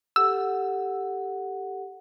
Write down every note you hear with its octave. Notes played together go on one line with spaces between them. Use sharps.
G4 A4 F#5 E6